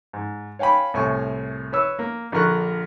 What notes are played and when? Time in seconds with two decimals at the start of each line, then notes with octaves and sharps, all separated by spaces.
0.13 G#2
0.59 C#5 F5 G5 G#5 B5
0.94 C2 A2 G#5 C#6
1.72 B4 C#5 E6
1.99 A#3
2.32 A#1 D3 A#4 C#6 F#6